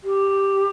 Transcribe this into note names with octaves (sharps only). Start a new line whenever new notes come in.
G4